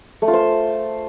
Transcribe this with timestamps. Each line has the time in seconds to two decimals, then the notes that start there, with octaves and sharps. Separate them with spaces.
0.22 A3
0.28 F4
0.33 C5